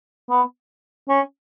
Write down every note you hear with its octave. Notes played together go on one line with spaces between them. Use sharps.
B3
C#4